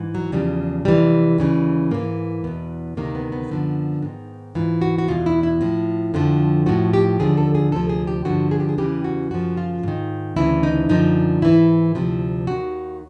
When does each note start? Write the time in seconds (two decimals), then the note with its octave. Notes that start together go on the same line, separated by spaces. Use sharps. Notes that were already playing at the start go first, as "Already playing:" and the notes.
Already playing: G#2 E3
0.15 F#3
0.32 E2 C#3 F3 G3
0.85 F2 C3 E3 G3
1.38 D#2 C#3 E3
1.91 G#2 E3 A#3
2.44 E2 B2 B3
2.97 D2 C3 D#3 A#3
3.15 B3
3.32 B3
3.50 F#2 D3 F3
4.02 G#2 D#3
4.55 G#2 E3 F4
4.82 F#4
4.98 F#4
5.08 E2 B2 F4
5.26 E4
5.43 E4
5.61 A2 F3
6.14 F2 D3 F3
6.66 A2 F3 F#4
6.93 G4
7.19 D#2 D3 F3 G#4
7.37 A4
7.55 G#4
7.72 D2 C3 F3 A4
7.89 G#4
8.07 G4
8.25 G2 D3 F3 F#4
8.51 G#4
8.60 G4
8.69 G#4
8.78 E2 C#3 E3 G4
9.04 F#4
9.31 F#2 C#3 F3 F#4
9.57 F4
9.83 G#2 D#3
10.36 D2 C#3 E3 E4
10.63 D#4
10.89 F#2 D3 F3 D#4
11.42 G#2 E3 E4
11.95 D2 C3 F3
12.47 D#2 D#3 F#4